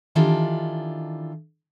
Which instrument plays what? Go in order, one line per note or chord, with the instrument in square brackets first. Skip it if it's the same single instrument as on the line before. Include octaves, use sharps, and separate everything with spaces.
[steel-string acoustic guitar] D#3 E3 D4 F4 G4 A4